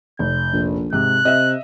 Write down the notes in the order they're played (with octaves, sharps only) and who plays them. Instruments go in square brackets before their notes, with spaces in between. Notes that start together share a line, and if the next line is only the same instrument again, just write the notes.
[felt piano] F1 [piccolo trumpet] G6
[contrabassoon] A#1
[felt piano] G#2 C3 [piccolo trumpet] F#6
[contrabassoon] C3 [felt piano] D#5 E5